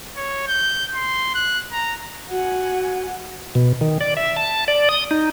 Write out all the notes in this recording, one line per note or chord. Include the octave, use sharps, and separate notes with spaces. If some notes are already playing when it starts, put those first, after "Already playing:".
C#5
G6
C6
F#6
A#5
F#4 F#5 G#5
B2
D#3
D5
E5
A5
D5
D#6
D#4